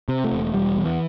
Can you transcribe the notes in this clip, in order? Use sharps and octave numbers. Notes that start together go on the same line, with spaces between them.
C3
A3
E1
E1 G3
E2
E3